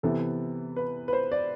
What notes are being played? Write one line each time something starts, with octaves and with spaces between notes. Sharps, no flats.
C3 E3 B3 A4
B4
B4
C5
D5